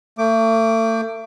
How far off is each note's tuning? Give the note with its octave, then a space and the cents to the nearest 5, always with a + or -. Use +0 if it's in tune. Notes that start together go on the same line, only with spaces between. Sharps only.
A3 +35 D6 +0